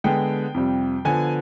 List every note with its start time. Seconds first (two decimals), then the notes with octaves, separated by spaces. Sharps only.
0.04 D3 G#3 B3 G5
0.54 F2 C3 G3
1.05 D3 F3 B3 G#5